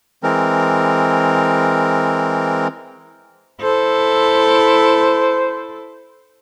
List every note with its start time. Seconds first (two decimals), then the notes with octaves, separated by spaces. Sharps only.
0.23 E3 G#3 C4 A#4
3.61 E4 A4 C5